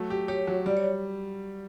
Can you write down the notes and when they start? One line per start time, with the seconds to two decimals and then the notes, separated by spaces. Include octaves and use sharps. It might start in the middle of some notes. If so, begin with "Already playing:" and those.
Already playing: F#3 A3
0.10 G4
0.28 G4 C#5
0.47 F#3
0.66 G3 D5
0.77 C#5